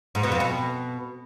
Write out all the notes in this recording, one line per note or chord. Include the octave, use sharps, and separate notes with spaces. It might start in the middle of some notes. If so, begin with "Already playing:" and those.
G#2
B2
F2
B2